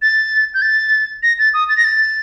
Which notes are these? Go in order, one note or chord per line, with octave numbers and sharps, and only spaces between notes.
A6
G6
A6
A#6
A6
D#6
A6
A#6
A6